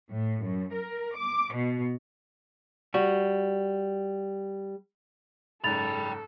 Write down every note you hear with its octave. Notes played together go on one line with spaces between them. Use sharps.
A2
F#2
A#4
D6
B2
G3 F#4
F#1 G#2 A4 G5 B5 A6 F7